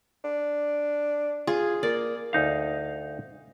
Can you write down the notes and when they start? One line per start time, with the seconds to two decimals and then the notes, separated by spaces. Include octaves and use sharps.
0.24 D4
1.47 F4 G#4
1.83 A#3 D5
2.33 D2 D#4 F5